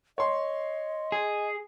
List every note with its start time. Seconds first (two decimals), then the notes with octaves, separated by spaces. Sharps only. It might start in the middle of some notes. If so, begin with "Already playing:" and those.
0.18 C#5 D#5 C6
1.12 G#4